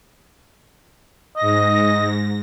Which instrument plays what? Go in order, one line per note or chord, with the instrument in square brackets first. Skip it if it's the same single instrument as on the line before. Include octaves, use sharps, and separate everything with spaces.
[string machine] G#2 A#6 [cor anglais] D#5